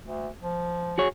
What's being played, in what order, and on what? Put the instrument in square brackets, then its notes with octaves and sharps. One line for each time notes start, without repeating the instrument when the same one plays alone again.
[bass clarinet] D2
F3
[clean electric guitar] F#4 G#4 C#5